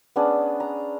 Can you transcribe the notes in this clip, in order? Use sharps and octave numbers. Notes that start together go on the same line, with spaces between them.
B3 C#4 D4 G#4
A#5